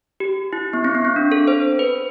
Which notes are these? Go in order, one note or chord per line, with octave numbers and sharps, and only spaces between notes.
G4
E4
B3
C4
B3
C4
D4
A4
C5
B4